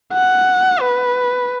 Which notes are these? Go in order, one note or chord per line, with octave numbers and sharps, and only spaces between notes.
F#5
B4